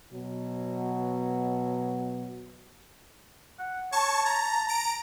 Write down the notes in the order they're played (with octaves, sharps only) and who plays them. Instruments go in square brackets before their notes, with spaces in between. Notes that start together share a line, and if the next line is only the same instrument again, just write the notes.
[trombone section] B2 F#3
[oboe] F#5
[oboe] C#5 [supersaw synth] A5 C#6
[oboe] A5 [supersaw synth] A#5
[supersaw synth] A#5 D7